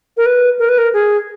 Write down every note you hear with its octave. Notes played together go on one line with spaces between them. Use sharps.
A#4
B4
A#4
B4
A#4
G#4